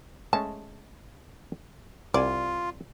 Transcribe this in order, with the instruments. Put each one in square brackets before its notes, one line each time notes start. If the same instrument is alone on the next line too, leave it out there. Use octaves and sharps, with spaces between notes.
[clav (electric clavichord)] G#3 A3 C#4 [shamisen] A5
[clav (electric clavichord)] C2 G#5 [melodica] F4 [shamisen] D5